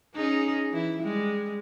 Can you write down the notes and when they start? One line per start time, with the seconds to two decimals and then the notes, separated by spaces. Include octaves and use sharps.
0.15 C#4 D#4 G#4
0.71 E3 E4
1.02 G3 G#3